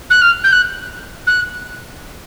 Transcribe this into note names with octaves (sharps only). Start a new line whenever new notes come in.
F#6
F6
G6
F#6
F#6